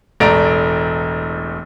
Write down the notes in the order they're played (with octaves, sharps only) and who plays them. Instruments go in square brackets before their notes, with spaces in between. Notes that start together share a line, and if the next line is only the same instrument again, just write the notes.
[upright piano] E1 A1 A3 D5 A#5 D7